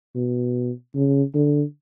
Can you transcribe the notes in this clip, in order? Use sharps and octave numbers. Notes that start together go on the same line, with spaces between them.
B2
C#3
D3